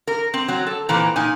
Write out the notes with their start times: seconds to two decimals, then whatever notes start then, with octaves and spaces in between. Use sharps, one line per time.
0.07 A#4
0.34 C4
0.48 F#3 C4
0.67 A4
0.89 A#2 E3 C4 A#5
1.16 A#2 D#4 G#5